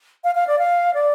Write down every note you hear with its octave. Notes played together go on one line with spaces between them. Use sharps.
F5
F5
D5
F5
D5